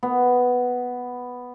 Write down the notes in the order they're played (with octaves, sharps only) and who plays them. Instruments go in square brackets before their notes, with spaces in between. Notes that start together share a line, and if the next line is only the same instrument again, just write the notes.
[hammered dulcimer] B3